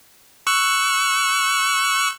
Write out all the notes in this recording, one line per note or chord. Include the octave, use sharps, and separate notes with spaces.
C#6 E6 F#6